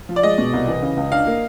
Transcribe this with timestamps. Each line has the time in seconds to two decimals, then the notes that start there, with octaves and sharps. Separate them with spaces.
0.09 F3
0.16 D5
0.23 G#3 D#5
0.38 B2
0.53 C2
0.68 E3
0.82 C#3
0.97 C#2
1.12 D4 F5
1.27 A#3